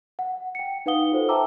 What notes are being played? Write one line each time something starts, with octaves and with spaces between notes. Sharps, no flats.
F#5
G5 C#7
D#4 B4 F5 F#5 D#6 G7
F4 F#4 A4 C5
E5 G5 A5 A#5 D6 E6